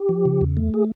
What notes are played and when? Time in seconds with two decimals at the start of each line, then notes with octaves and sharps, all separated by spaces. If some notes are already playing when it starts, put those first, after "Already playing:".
Already playing: G4
0.09 F3
0.25 C#3
0.41 E2
0.57 A3
0.74 G#4